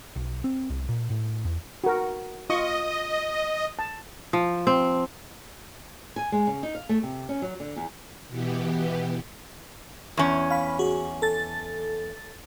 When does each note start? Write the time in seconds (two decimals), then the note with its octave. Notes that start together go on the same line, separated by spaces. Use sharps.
0.16 B1
0.44 C4
0.70 C2
0.89 A#2
1.10 A2
1.45 E2
1.84 F#4 A#4
2.50 F4 D#5 C#6
3.79 A5
4.33 F3
4.67 C4
6.16 G#5
6.32 G#3
6.47 C#3
6.63 D#4
6.75 F5
6.89 A3
7.03 C3
7.29 C#4
7.42 F#3
7.60 D3
7.76 E2
8.29 B2 E3 B3 G4
10.17 E2 C#4
10.50 F5 B5
10.79 F#4 G#4
11.22 A4 A6